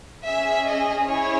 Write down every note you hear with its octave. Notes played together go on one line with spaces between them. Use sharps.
C#4 G#4 E5
D#5
C#4 E4 G#4 C#5